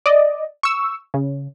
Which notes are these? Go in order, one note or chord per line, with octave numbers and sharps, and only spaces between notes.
D5 D#5
C#6 E6
C#3